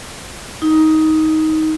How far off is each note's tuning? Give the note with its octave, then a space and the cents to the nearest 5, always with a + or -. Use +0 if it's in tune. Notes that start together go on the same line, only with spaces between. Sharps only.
D#4 +15